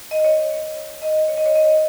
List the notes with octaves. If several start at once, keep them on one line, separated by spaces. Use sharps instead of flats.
D#5
C#5
C#5
D#5
C#5
D#5
C#5
D#5
C#5